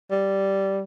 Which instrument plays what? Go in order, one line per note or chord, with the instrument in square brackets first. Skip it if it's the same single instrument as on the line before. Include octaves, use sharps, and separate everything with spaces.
[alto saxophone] G3